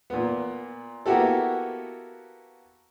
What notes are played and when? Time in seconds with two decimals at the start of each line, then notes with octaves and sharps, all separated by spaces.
0.10 A#2 B3
1.06 A#3 B3 E4 F#4 G4 A4